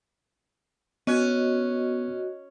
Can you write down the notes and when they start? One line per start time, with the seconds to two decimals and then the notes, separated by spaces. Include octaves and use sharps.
1.07 B3 C#4 F#4 D#5